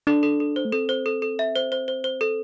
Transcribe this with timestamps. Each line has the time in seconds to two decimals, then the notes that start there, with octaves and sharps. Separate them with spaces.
0.07 D4 A4
0.23 A4
0.40 A4
0.56 C5
0.65 A3
0.72 C4 A4
0.89 C5
1.06 A4
1.22 A4
1.39 E5
1.56 C5
1.72 C5
1.88 C5
2.04 C5
2.21 A4